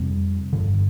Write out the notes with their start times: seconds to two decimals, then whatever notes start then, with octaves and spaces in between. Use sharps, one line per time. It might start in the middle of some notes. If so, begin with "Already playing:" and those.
Already playing: F2 C3 G3 C4
0.53 G2 D3